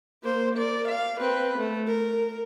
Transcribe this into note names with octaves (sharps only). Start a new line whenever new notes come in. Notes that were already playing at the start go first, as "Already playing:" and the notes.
A#3 C5
A#4 D5
F5
C4 B4
A3
A#4